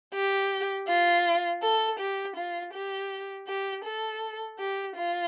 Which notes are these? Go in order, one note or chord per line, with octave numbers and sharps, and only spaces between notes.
G4
F4
A4
G4
F4
G4
G4
A4
G4
F4